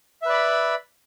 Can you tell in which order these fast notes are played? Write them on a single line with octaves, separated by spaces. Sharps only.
E5 B4 D5 B5